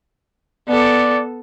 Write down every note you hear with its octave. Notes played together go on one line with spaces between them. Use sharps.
B3 A4 D5